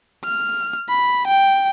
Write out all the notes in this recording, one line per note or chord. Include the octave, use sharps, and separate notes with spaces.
F6
B5
G5